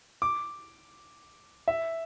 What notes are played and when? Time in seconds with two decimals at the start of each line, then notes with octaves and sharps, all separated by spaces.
0.22 D6
1.68 E5